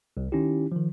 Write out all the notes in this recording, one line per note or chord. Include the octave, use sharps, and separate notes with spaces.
C2
D#3 C#4 D#4 E4 G4
D#3 F3